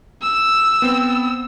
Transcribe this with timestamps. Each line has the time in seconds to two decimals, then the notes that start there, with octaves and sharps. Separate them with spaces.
0.22 E6
0.82 B3 C4